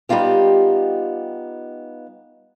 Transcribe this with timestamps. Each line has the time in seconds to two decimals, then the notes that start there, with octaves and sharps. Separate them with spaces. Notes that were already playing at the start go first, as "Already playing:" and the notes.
0.09 G3 B3 D#4 F4 G4